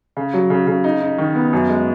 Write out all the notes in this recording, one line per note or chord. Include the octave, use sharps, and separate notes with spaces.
C#3
F#3
C#3
C#3
D#4
D#4
D#3
B3
F#2
G#3